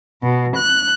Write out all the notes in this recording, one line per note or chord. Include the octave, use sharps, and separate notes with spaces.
B2
F#6